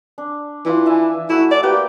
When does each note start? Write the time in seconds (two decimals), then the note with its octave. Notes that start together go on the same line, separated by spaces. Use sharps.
0.18 D4
0.66 E3 D4 F4
0.86 E4 E5 G#5
1.30 A3 E4 F#4
1.51 D5
1.63 A#3 G4 B4 D6